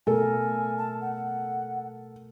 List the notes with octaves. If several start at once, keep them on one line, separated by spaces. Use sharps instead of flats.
B2 A3 A4 A#4 G#5
A5
F#5